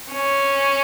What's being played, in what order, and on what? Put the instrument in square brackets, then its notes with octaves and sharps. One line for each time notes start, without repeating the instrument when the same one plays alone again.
[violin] C#4